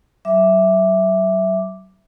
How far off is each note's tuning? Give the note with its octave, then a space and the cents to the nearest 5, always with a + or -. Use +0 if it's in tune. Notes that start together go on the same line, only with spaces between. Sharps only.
F#3 +40 E5 +0 D6 +0